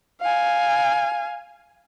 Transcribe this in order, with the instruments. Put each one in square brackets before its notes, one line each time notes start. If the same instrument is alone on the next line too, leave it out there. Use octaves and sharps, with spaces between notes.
[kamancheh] F5 G#5